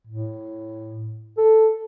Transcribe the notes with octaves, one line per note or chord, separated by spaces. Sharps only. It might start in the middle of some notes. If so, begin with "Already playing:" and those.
A2
A4